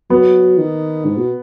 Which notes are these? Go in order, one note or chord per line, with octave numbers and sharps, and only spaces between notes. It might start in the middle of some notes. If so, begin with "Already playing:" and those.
F#3 B3
D#3
G#2
B2